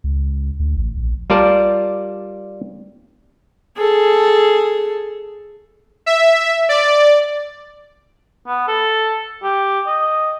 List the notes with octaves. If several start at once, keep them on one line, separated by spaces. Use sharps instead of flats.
C#2
D2
A1
A#1
G3 F4 A#4 D5 A5
G#4 A4
E5
D5
B3
A4
G4
D#5